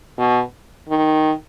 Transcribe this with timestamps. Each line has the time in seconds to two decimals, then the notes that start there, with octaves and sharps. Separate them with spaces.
0.19 B2
0.89 D#3